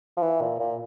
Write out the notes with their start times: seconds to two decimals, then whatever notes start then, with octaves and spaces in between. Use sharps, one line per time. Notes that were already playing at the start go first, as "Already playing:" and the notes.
0.17 F3
0.23 E3
0.41 A#2
0.60 A#2